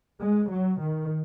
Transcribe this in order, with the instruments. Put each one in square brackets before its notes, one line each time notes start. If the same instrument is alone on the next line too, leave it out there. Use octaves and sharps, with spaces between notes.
[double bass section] G#3
F#3
D#3